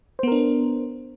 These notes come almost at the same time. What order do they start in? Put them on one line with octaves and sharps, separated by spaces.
C5 B3 A#4 D4